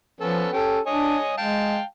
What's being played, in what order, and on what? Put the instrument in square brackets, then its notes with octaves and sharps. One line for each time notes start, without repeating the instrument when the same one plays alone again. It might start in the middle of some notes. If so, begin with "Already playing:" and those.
[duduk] F3 [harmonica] B3 C#4 A4
[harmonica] C#4 G4 [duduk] A4
[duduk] D4 [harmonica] C#5 D#5 G#5
[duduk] G#3 [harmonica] F5 G5 A5